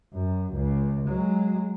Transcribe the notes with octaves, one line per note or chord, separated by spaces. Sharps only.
F#2
C#2
F#3 G#3